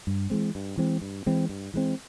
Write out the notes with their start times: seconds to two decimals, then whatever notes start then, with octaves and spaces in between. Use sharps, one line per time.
0.07 G2
0.30 E3 G#3 C4
0.55 G2
0.77 E3 G#3 C4
1.02 G2
1.26 E3 G#3 C4
1.49 G2
1.74 E3 G#3 C4